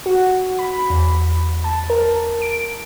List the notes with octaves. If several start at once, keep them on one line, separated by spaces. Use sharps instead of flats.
F#4
B5
E2
A5
A#4
D7